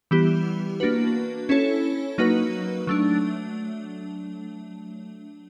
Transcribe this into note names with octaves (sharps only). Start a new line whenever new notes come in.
E3 G3 B3 E4 G4
A#3 D4 F#4 B4
C#4 E4 A4 C#5
F#3 A#3 D#4 F#4 B4
F#3 A3 D4